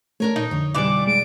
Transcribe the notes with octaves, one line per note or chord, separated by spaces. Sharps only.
A3 D4 A#4 C#5
A#2 D#4
F2 D3 C#5
B2 E3 G3 D4 D5 D6
G#3 D7